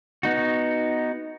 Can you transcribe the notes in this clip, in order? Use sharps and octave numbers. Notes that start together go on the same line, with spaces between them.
B3 D#4 F#4